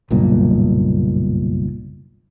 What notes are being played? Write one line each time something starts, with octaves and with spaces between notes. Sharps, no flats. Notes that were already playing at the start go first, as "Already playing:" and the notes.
F#1 B1 G2 A#2